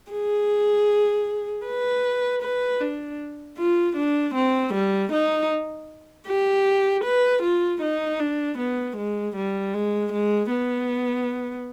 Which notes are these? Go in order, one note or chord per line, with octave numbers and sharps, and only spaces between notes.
G#4
B4
B4
D4
F4
D4
C4
G3
D#4
G4
B4
F4
D#4
D4
B3
G#3
G3
G#3
G#3
B3